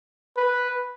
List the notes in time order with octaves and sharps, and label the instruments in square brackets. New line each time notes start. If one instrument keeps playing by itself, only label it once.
[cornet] B4